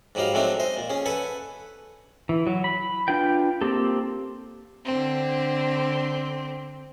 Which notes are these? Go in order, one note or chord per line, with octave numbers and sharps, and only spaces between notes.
G#2 F#3 G3 D#4 F5
F#3 G#3 A3 C4 D4 D#4
C5 D#5
A#2
C#4 G#4
A4 B4 F#5 G#5
E3
F#3
B5
D4 F4 B4 G5
A#3 C4 G4 A4
D3 C4